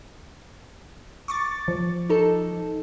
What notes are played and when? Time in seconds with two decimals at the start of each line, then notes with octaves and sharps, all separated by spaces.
1.28 C#6 D6 A6
1.68 F3
2.10 D#4 A4